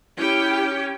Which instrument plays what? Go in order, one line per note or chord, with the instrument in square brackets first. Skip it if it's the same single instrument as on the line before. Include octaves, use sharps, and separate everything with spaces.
[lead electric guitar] C#4 [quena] E4 [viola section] G4 G5